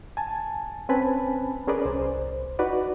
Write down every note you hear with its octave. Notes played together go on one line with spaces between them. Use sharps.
G#5 A5
C4 C#4 B4 G#5 A5 B5
C#4 G#4 A#4 B4 D5
C2 C5
D#4 F#4 B4 D5